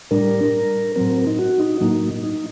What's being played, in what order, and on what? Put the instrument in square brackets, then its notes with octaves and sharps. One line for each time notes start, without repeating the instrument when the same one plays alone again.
[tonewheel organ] A2 G3 D4 A#4
A2 F#3 C4 A#4
D#4
F#4
D#4
A2 F#3 A#3 D#4
D#4